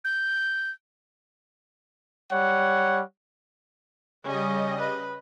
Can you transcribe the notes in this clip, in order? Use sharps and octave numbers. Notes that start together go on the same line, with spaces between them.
G6
G3 C#5 F#5
C#3 G3 C#4 D#5
B4